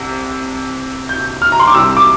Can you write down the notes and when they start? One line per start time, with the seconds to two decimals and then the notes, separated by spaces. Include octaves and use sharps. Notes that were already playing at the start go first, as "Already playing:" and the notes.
Already playing: C2 C3
1.09 G6
1.42 F6
1.52 A#5
1.60 C6
1.67 D6
1.75 C2 C3 G3 E6
1.97 D6